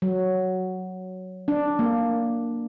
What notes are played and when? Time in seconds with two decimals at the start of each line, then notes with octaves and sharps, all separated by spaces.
0.02 F#3
1.48 D4
1.79 A#3